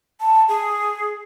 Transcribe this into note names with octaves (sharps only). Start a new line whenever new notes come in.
A5
G#4